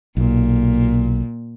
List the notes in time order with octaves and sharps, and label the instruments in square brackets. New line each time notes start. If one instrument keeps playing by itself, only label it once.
[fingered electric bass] B1 [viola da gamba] A#2